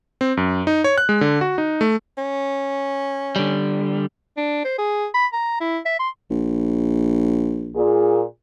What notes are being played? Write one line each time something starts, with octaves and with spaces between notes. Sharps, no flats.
C4
F#2
D#4
C#5
F#6
G#3
D3
F#4
D#4
A3
C#4
D3 G3
D4
C5
G#4
B5
A#5
E4
E5
C6
A#1
A#2 G#4